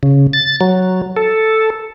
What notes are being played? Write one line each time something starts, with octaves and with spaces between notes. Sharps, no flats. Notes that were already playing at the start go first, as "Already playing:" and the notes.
C#3
A6
F#3
A4